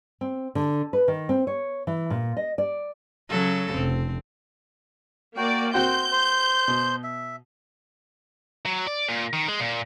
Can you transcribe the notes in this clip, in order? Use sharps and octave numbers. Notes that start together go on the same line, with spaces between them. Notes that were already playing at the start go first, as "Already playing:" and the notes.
C4
D3
B4
D#3
C4
C#5
E3
A#2
D#5
D5
C#3 F#3 A4
F1 C4
A#3 F#4 D5 G5
C4 F#4 C5 G5 G6
C5
B2
E5
F#3
D5
A#2
D#3
G#3
A#2